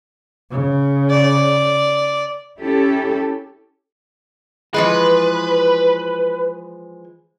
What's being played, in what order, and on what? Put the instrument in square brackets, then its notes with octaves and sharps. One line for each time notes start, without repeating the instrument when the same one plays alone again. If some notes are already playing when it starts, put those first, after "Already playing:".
[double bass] C#3
[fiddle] D5
[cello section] C#4 E4 G4 A4
[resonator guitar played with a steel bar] E3 F3 G#3 [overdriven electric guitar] B4